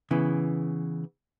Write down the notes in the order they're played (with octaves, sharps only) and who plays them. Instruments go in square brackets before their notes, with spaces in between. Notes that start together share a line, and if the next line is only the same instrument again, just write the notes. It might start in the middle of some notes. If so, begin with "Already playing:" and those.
[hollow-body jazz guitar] C#3 E3 B3